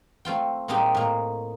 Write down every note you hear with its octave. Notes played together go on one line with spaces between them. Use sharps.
A3 C4 F4 G5
A#2 G3 G#3 C4 D#4 G4
A2 A#3